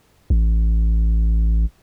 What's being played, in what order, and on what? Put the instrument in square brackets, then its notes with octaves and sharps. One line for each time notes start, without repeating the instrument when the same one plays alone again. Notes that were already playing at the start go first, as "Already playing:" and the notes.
[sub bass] A1